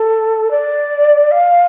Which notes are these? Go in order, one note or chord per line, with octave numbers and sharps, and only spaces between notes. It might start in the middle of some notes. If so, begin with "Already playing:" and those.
Already playing: A4
D5
F5